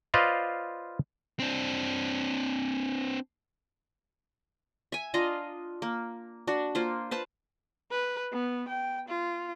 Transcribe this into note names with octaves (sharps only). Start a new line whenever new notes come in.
F4 B4 C5 D5 D#5 F5
C4 D4
E5 G#5
D4 F4 D#5 A#5
A#3
D4 F#4
A#3 F4 C5
B4 C5 A5
B4
B3
G5
F4